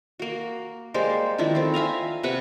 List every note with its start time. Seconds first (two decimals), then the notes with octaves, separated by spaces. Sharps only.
0.19 A#3 F#4
0.94 G3 G#3 A#3 C5
1.38 D#3 F3 D4 E4
1.55 A3 C4
1.74 E5 F5 G#5 A#5
2.23 C3 B4 F#5 B5